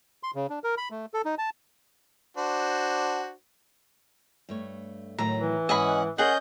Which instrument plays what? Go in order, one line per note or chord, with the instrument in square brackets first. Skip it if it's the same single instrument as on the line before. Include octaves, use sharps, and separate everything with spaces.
[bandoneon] C6
C#3
D4
A#4
B5
A3
A4
D#4
A5
[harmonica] D4 F#4 C5
[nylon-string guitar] G2 A3 C#5
[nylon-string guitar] A2 D#3 F#3 [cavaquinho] A#5
[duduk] E3
[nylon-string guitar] G#2 [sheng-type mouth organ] C#4 F#5 [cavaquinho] D#5 G#5 B5
[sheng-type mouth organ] C#4 D#5 G6 [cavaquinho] G#4 F#5 [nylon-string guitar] A#4 C5